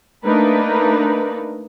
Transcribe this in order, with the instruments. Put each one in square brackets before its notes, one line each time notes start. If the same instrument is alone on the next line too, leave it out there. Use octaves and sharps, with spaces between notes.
[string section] A3 A#3 D4 D#4 A#4 B4